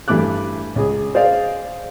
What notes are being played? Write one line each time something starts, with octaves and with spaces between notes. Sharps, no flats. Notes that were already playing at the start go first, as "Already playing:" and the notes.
G2 E3 A3 D6 F#6
C#2 G#4
G#4 C5 D5 D#5 F5